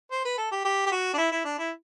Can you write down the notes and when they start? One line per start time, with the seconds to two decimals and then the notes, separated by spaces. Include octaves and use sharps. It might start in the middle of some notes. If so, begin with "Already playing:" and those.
0.11 C5
0.25 B4
0.37 A4
0.51 G4
0.65 G4
0.86 G4
0.92 F#4
1.14 D4
1.18 E4
1.32 E4
1.45 D4
1.59 E4